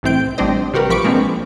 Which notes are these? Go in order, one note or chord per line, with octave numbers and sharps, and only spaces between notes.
C2 A2 E3 C4 G6 D7
A1 G3 C4 D4 C5 D#5
C3 F#4 G4 A#4 B4
A#1 F3 B5 C#6 D6 D7
G#3 A#3 C4 D4